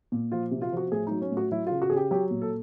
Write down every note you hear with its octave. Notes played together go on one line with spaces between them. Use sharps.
A#2
F3 F4
C3
F4
F3 F#4
A2 G#4
F#3 D#4
C#4
A2
F#4
F#3 E4
C#3 F4
F#4
C#3 G#4
G4
F#3 G4
A#2
A4